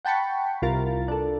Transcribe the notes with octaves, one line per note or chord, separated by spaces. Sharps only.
F#5 G5 A5 B5 C#6
C2 F4 A#4 A6
D4 A4